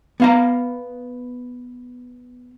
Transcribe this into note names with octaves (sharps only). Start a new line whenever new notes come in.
B3 F5 A#5